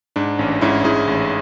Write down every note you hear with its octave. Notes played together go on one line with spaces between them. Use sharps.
G#2 D4
A1 C#4
G#2 C#4 E4
G#2 E4 G#4
A1